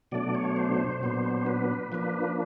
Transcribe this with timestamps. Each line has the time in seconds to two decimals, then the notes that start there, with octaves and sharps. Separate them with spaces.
0.12 B2 F#3 A3 D4 D5
0.35 C#5
0.56 C5
1.01 A#2 F#3 B3 D4
1.46 B4
1.92 F3 A#3 D4 B4